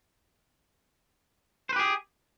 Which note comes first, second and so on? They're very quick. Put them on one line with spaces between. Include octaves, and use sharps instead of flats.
C5 B4 G4 G#4